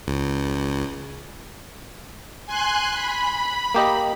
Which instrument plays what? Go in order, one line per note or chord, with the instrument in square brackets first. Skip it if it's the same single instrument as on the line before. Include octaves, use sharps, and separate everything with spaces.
[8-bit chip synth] C#2
[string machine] G#5 C6 F#6
B5
[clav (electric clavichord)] A#3 G4 D#5